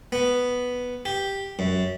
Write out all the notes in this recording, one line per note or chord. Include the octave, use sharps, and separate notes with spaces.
B3
G4
F#2